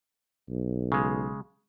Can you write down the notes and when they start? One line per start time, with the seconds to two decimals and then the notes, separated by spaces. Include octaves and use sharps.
0.49 B1
0.92 C#3 G#3